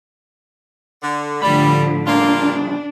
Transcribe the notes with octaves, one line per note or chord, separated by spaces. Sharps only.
D3
A2 D3 F3 G3 B5
G2 C#3 F3 A#3 D4 F4